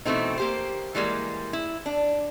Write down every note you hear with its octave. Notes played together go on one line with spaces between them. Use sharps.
B2 E3 A3 C4 D#4
A#3 G4 C5
E3 G3 G#3 A#3
E4
D4